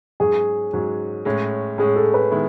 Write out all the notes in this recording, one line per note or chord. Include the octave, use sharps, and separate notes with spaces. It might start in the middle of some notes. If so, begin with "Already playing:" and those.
G#2 F#3 C#4 F#4 G#4
G#2 F#3 C#4 F#4
A2 G#3 C#4
A2 G#3 C#4 G#4
A4
B4
D#3 G#3 B3 E4